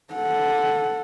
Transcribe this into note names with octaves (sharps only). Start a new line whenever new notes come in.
A4 F#5